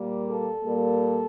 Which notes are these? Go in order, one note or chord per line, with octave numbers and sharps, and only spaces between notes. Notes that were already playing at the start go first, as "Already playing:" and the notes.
Already playing: A#2 G3 A#3
A4
A#2 G3 A#3